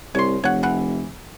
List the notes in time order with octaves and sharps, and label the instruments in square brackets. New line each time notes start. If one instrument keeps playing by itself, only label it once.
[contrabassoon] C2 [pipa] C#5 C6
[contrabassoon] F1 [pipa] C#5 F#5
[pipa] E3 F#5